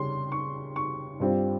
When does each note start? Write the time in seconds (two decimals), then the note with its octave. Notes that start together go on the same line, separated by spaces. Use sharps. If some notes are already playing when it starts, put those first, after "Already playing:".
Already playing: C#3 G3 C#4 C6
0.32 C#6
0.76 C#6
1.20 G2 G3 C4 F4